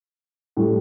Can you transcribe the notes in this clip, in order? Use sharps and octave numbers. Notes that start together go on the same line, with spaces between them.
A2 G3